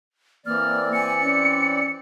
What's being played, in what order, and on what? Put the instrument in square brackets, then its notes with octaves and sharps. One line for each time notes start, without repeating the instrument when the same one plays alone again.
[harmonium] E3 C4 D5 [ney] A#3 [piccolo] F6
[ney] G#5 [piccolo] C#7
[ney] C#4